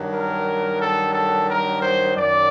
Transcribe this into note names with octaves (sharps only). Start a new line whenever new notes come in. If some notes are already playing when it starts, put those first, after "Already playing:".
Already playing: G2 D#3 F#3
A#4
A4
A4
A#4
C5
F#2 D#3 F#3 D5